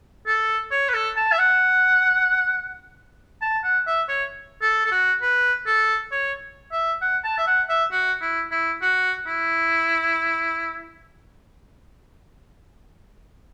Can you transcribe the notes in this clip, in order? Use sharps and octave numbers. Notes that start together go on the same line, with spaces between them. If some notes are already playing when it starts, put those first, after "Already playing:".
A4
C#5
B4
A4
A5
E5
F#5
A5
F#5
E5
C#5
A4
A4
F#4
B4
A4
C#5
E5
F#5
A5
E5
F#5
E5
F#4
E4
E4
F#4
E4